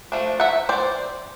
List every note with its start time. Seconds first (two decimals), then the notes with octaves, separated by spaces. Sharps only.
0.12 F3 A3 D4
0.40 E5 F#5
0.69 C5 D5